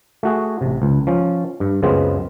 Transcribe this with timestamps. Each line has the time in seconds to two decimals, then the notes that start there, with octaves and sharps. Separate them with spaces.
0.23 A3 F#4 G#4
0.61 A1 C3
0.82 C#2
1.07 F3 C#4
1.60 G2
1.82 C#2 F#2 C#3 G#3 B3 C4